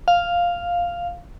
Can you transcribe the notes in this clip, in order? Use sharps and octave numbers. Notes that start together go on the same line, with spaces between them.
F5